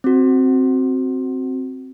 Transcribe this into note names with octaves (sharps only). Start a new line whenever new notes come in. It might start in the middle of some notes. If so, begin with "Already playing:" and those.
C4 F#4